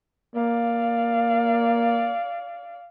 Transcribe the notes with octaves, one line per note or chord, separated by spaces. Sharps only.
A#3 D5 F5